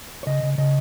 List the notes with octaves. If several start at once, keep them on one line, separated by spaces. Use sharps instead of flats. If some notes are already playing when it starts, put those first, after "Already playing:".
C#5
C#3 D#5
C#3
C#3 D#5